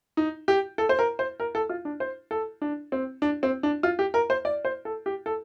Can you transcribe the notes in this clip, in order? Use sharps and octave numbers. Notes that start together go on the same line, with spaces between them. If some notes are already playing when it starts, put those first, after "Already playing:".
D#4
G4
A4
C5
A#4
C5
A#4
A4
F4
D4
C5
A4
D4
C4
D4
C4
D4
F4
G4
A#4
C5
D5
C5
A4
G4
A4